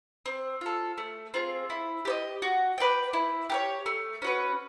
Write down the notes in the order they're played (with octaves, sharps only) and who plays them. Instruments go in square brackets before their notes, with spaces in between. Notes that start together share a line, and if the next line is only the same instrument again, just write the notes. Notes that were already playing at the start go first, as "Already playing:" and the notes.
[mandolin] C4
F4 A4
A3
C4 F4 G#4
E4
G4 C5 D#5
F#4
B4 D5 G5
E4
G4 A#4 C#5
A3
C#4 F#4 B4